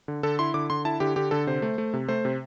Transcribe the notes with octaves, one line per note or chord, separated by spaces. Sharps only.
D3
D3 A4
E4 C6
D3 D6
D3 C6
E4 A5
D3 G4
D3 G4
D3 A4
C3 C5
A3
A3
C3
A3 C5
C3